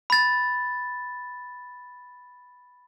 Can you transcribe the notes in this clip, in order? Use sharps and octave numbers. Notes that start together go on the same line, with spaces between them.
B5 A6